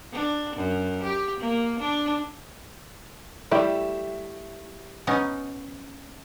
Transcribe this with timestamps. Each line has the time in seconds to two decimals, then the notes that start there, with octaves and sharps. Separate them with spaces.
0.12 D4
0.56 F#2
1.03 G4
1.40 A#3
1.80 D4
3.51 G3 A3 E4 G4
5.07 B3 C#4 D#4